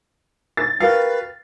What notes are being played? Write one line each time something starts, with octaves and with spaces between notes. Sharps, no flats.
A6
F#4 G4 A#4 B4 F5